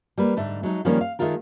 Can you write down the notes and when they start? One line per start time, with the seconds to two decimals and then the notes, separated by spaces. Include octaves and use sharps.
0.18 G3 A#3 B4
0.37 G#2 D3 A3
0.63 F#3 G#3 D#4
0.85 D#3 F3 G3 A#3 C#4
1.01 F5
1.19 D#3 F3 G#3 A3 F4 A#4